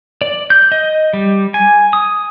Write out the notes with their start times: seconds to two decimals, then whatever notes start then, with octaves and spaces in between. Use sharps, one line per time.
0.22 D5
0.50 G6
0.72 D#5
1.13 G3
1.54 G#5
1.93 D#6